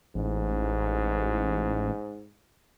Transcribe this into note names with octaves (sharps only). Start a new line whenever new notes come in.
A1 G#2